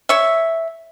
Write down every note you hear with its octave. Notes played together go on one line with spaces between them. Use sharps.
C#5 E5